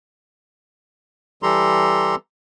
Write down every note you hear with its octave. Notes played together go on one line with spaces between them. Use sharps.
E3 G3 G4 A4 A#5 C6